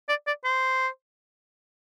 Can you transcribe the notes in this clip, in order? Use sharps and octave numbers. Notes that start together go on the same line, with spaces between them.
D5
D5
C5